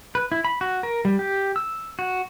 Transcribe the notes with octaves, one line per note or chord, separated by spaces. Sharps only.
B4
E4
B5
F#4
A#4
G3
G4
E6
F#4